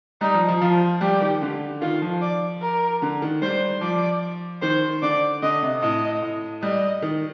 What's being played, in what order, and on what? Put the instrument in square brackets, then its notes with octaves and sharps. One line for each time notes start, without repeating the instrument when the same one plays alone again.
[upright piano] G3 [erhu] D#4
[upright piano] F3
F3
[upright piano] F3 [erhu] F4
[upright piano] G3 [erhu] G4
[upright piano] D#3
D3
[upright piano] D#3 [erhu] F4
[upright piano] F3
[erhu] D5
A#4
[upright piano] D3
D#3
[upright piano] G3 [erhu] C5
[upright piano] F3 [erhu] D5
[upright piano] D#3 [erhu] C5
[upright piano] D3 [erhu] D5
[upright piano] D3 [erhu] D#5
[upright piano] C3
[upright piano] A2 [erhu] D#5
[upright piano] A2
[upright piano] G3 [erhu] D#5
[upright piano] D#3